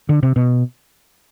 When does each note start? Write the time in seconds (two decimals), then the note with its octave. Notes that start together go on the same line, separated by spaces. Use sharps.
0.09 D3
0.23 C3
0.36 B2